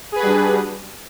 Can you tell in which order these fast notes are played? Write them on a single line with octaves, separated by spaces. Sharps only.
G#4 B4 F#4 G3 D4